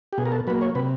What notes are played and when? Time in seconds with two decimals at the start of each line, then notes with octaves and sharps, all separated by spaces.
0.13 G4
0.18 B2 G#4
0.25 A#4
0.32 A4
0.47 F#3 B4
0.50 A#3
0.61 C#5
0.75 C3 B4